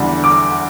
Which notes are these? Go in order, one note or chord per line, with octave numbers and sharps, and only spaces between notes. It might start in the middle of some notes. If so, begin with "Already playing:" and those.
Already playing: E2 D3 G3
D6